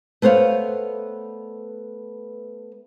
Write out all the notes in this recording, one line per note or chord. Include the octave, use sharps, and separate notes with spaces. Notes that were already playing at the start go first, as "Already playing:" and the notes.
A3 B3 C5 C#5 F5